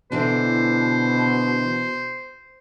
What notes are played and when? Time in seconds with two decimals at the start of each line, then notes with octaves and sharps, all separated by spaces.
0.12 B2 D3 E3 D4 C5